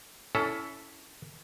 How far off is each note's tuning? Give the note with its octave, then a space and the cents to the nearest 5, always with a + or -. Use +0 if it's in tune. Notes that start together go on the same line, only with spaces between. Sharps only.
C#4 +20 E4 +0 A4 +0